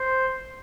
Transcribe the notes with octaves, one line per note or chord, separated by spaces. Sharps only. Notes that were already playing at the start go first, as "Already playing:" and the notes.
Already playing: C5